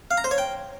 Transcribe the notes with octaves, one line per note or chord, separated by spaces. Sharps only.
F5
A#5
C5
C#5
G5